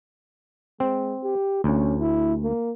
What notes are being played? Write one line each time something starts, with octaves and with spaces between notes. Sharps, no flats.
G#3 C4
G4
D2 C#4
E4
A#3